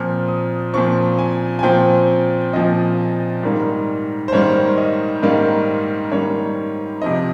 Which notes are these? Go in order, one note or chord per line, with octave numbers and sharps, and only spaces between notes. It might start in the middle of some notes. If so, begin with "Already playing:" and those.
Already playing: A#2 F3 C4 F6
D#6
A#2 F3 C4 C#6
G#5
G#5
A#2 F3 C4 G5
A#2 F3 C4 D#5
G#2 D#3 G3 A#3
C5
G#2 D#3 G3 A#3 C#5
D#5
G#2 D#3 G3 A#3
G#2 D#3 G3 A#3 C#5
C3 F3 C4 D#5